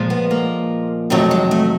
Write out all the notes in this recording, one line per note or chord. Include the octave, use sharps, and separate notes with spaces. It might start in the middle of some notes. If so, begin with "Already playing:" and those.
Already playing: A#2 F3 G#3
B3
A#3
F2 C3 D#3 F#3 A3
G#3
A3